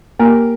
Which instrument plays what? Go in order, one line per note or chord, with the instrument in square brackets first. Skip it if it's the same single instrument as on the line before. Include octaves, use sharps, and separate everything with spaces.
[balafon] A#3 [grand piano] G4 A#4